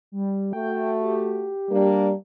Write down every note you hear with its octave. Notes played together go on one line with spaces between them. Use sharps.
G3
A3 F#4 G5
G4
G3 A#3 D4